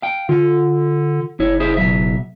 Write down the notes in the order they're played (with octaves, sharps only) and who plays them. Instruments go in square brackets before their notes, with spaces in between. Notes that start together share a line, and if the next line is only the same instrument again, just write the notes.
[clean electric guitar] F5 G5
[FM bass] D3 [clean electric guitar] F4
[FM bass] F#1 [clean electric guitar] E4 C#5
[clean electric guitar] E4 G#4 C5
B2 F#3 E5